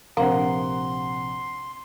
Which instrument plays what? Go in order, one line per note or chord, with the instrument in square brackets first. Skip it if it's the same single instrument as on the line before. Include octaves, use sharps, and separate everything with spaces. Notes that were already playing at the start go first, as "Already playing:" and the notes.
[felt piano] A#1 C3 C5 [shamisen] A#3 [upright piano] F#5 A#5 [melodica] C6